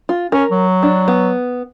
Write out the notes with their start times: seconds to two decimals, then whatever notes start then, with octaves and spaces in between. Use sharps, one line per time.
0.09 F4
0.32 C#4 A#4
0.51 F#3
0.83 D4
1.08 B3